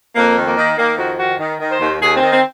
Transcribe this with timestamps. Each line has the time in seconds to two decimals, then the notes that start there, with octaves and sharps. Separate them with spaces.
0.15 F2 A#3
0.37 D#3
0.47 A#3
0.57 D#3
0.77 D#3 A#3
0.97 F2 F#4
1.19 D#3 F#4
1.39 D#3
1.59 D#3
1.70 C5
1.80 D#2
2.01 D#2 G#4
2.16 C4
2.22 D#3
2.32 C4